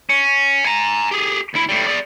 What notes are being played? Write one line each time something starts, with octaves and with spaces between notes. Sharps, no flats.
C#4
G#5 A#5
G4 G#4
D2 E4
A2 G3
G#4 D5